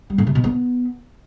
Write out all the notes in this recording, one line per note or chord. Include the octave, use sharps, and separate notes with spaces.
G3
A2
C3
B2
B3